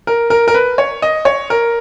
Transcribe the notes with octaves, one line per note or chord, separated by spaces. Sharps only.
A#4
A#4
A#4
B4
C#5
D#5
C#5
A#4